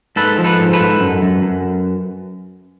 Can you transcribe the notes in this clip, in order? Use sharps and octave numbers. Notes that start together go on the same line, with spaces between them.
G#2 A4 B4
F3
A4 B4
G#2
A4 B4
G#2
F#2
F#2
F#2